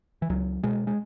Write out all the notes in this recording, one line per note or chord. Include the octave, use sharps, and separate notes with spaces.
E3
C#2 F#3
B2 G#3
G#3